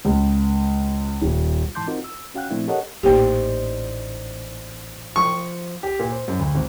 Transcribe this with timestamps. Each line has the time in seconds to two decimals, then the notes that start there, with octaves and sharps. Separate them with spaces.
0.05 C#2
1.21 D#1
1.75 G#2 E3 A5 C6 D6 G6
1.87 C4 D#4 F4 F#4 A#4
2.04 E6
2.34 C#4 F#4 F5 G5 F#6
2.50 A#2 F3 A3 C4 D4 E4
2.68 G4 A4 A#4 C#5 D#5 F#5
3.03 A1 A#2 A#3 D#4 G4 C5 D5
5.16 F3 C#6
5.83 G4
6.00 A#2
6.12 C5
6.28 F#2
6.39 D2
6.55 G#1